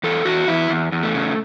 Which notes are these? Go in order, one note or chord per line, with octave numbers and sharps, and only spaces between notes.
E2 A4
E2 F#4
E2 E4
E2
E2
A3
C#3